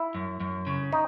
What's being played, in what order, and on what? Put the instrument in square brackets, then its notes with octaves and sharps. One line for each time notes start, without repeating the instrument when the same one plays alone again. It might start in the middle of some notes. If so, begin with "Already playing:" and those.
Already playing: [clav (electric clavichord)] E4
[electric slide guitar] F#2
F#2
C#3
[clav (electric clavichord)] D#4